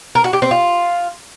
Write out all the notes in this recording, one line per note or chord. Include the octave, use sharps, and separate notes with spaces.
A#4
F#4
G4
C4
F4